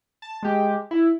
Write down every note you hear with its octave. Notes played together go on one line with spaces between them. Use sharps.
A5
G#3 G4
E4